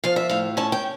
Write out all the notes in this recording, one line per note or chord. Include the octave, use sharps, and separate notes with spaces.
F3 F5
E5
A2 F5
C#4 A5
G5